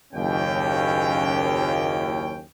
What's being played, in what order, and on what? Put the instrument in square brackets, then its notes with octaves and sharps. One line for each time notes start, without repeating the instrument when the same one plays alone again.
[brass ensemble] F#1 D#2 C#4 G5